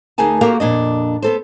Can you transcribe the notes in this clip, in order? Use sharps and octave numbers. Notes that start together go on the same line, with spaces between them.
D2 D#4 G#4 A#4 G#5 A5
A#3 F#4 G4 A4 A#4 F5
F2 A#2 D4 D#5
B3 A4 C5